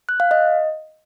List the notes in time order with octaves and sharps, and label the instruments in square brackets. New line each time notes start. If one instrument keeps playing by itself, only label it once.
[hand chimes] F#6
F5
D#5